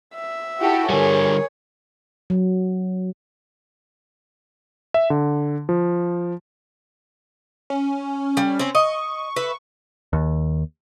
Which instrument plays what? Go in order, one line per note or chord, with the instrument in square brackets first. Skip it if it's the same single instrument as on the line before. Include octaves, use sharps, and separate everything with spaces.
[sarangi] E5
[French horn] E4 [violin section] F#4 G4 A4
[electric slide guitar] D3 G3 [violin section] G#4 [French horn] A#4 [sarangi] C#5
[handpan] F#3
[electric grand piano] E5
D3
F3
[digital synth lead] C#4
[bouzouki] G3
C4 C#4
[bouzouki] D#5 [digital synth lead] C#6
[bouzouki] B4 E5
[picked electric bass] D#2